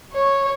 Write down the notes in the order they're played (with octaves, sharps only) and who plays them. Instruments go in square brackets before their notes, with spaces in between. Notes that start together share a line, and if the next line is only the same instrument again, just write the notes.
[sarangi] C#5